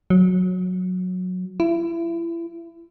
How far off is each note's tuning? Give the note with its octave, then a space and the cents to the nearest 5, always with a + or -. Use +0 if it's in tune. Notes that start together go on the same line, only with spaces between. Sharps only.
F#3 -15
E4 +30